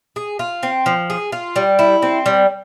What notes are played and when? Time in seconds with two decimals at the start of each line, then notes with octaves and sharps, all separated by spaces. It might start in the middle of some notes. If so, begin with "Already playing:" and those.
0.16 G#4
0.39 F4
0.63 C4
0.86 F3
1.10 G#4
1.32 F4
1.56 G3
1.79 E4
2.02 C4
2.26 G3